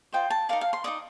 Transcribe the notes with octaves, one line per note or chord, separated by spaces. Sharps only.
F4 C5 D#5 G5
A5
D#4 A#4 D5 F5
F5
C6
D#4 A#4 D5 D#6